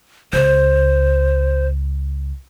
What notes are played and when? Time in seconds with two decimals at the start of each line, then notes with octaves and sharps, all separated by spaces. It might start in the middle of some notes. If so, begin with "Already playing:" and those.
0.33 C#2 C5